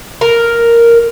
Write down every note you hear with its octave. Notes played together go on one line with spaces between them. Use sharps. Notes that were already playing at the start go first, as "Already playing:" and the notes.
A#4